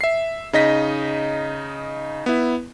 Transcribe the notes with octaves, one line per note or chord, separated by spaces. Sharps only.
E5 C7
C#3 D#4 D#5 A#6 B6
B3 E4